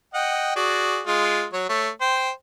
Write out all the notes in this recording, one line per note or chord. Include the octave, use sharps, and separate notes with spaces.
D#5 F#5 G5
F#4 G#4 D5
G#3 F4
F#3 C#5
A3 C#5
C5 G5